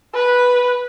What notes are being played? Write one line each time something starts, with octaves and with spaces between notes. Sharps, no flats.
B4